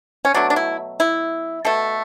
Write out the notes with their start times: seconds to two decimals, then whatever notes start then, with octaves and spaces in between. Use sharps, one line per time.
0.25 C#4
0.34 B2 F#3 A3 D4
0.50 D4
0.56 E4
1.00 E4
1.65 B2 A3 A4